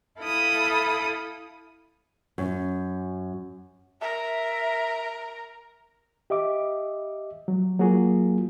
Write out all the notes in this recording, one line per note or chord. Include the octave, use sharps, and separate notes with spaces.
E4 A4 F5 B5 D#6
F#2
A#4 E5
G4 D#5 E5 D6
F#3
F#3 A#3 F4 F#4 G#4